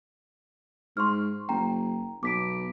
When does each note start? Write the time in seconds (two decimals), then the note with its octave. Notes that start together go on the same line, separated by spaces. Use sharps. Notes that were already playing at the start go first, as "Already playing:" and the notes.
0.97 G#2 C6 C#6 F6
1.49 F#1 G5 A#5
2.23 B1 D6 B6 D7